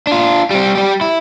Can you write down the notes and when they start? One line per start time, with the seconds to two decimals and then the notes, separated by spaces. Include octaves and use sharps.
0.07 D4 F4
0.51 G3 C4
0.75 G3 G4
1.01 E4